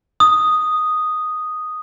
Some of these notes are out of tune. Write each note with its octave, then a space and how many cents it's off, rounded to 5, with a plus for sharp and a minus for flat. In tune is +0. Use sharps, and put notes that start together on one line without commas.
D#6 -5